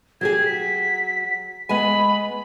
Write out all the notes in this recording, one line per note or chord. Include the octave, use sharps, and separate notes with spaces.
F#3 G4 G#4 G#6
B6
G#3 B3 G#5 B5